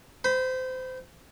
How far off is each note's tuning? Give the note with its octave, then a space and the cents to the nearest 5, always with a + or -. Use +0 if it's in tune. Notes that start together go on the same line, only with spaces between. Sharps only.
C5 -25 B5 +0